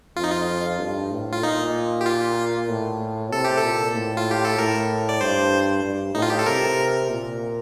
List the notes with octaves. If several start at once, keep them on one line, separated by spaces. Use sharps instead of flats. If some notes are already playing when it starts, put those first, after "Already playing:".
F2 F4
D#4
F4
G2
A2
F4
A#2 D#4
G4
F4
A2
C3 A4
G4
A4
A#2
A2
F4
G4
A4
A2 A#4
D5
G2 C5
G2
A2 D#4
F4
G4
A4
C3 A#4
A#2